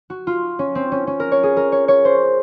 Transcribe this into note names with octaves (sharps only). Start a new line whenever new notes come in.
F#4
F4
C#4
C4
C#4
C#4
A#4
C#5
G#4
A#4
C#5
C#5
C5